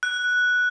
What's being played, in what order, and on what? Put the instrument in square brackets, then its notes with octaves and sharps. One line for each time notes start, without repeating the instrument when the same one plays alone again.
[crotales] F#6